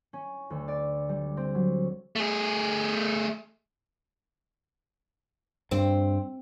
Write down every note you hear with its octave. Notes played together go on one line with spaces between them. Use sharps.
C#4
D2
D5
G3
C4
F#3
A3 G#4
G2 C4